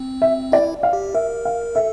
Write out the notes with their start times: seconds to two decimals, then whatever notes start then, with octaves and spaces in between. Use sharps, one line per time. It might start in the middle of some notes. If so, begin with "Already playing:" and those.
Already playing: C4
0.22 E5
0.52 E4 D5
0.83 F5
0.93 G4
1.14 A#4 E5
1.45 F5
1.75 A4 E5